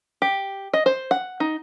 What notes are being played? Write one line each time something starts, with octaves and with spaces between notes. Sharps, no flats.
G4
D#5
C5
F#5
D#4